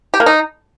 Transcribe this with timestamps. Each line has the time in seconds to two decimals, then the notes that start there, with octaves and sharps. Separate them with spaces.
0.14 G4
0.20 A#3
0.26 D#4